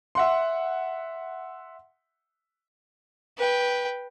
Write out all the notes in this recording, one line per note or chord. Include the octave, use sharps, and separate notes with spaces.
E5 F#5 C6
B4 G5